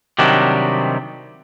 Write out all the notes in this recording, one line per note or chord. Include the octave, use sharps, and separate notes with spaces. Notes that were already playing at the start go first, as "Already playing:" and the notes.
C3 D#3 F#3 G3 D4